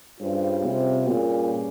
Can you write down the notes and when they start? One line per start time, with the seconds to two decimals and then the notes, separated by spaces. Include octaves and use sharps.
0.21 G2 G3 C#4 F4 G#4 C5
0.65 C3
1.07 G2 A#2 G3 C#4 G#4